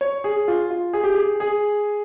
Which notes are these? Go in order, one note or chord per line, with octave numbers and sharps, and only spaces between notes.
C#5
G#4
F4
F4
G#4
G4
G#4
G#4